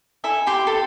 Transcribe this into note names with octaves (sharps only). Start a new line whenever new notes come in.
E4 A4 E5 G#5
G4 G5 B5 C6
A4